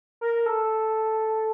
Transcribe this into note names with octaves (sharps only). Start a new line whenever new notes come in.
A#4
A4